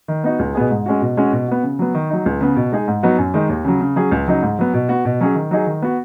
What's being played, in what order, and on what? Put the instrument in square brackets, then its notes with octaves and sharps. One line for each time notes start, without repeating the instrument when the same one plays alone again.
[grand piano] D#3
B3 D#4 F#4
C#2
B2 B3 G#4
G#2
G#3 C#4 F#4
B2
G#3 C#4 F#4
B2
B3 F#4
C#3
F#3 B3
D#3
F#3 D#4
C#2
C#3 B3
B2
G#3 D#4 G#4
G#2
F#3 B3 D#4 F#4
F#2
D#3 G#3 D#4
D#2
C#3 F#3
C#3
F#3 C#4 G#4
C#2
C#3 F#3 D#4
G#2
F#3 B3
B2
B3 F#4
B2
F#3 C#4 G#4
D#3
F#3 D#4 G#4
D#3
B3 F#4